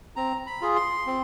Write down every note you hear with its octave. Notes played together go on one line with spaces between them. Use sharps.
C4 A#5
B5
F4 G#4
C6
C4